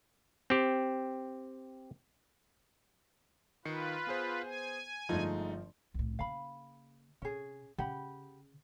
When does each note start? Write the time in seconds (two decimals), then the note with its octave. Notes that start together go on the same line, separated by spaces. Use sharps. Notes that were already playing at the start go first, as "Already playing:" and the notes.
0.50 C4 G4
3.65 D#3 F4 B4 C7 C#7
4.07 B3 G#4 C5
4.44 G#5
5.09 G1 F3 G#3 A3 D#4
5.94 C2 A2
6.19 C#3 A#3 F5 B5
7.22 C3 C#4 G#4
7.78 C#3 G4 F#5 B5